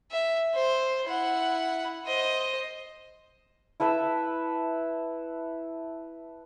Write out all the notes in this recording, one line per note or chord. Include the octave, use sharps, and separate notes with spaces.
E5
C5
E4 F#5
C5 D#5
E4 A4 B4 E5